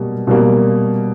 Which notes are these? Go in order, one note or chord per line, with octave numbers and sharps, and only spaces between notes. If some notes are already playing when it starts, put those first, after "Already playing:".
Already playing: B2 G3 A#3
B2 G3 A#3